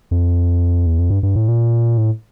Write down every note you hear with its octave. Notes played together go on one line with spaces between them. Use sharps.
F2
E2
F2
G2
G2
A2
A#2
A2